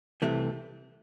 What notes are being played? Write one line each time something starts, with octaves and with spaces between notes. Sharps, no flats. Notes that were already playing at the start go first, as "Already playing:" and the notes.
C2 C3 E3 A3